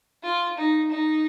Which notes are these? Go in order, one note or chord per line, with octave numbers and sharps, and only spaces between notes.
F4
D#4
D#4